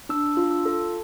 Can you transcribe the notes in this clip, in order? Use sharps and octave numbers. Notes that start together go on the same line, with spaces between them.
D4 E6
F4
E6
A4